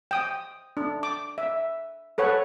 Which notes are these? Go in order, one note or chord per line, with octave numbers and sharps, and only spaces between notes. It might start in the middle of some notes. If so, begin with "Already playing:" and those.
G5 D#6
D4
D6
E5
A4 B4 C#5 F#5